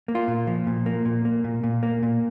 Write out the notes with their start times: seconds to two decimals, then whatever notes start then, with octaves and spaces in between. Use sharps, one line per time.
0.08 A#3
0.15 F4
0.28 A#2
0.47 F3
0.67 A#2
0.86 A#3
1.05 A#2
1.25 A#3
1.44 A#2
1.63 A#2
1.83 A#3
2.03 A#2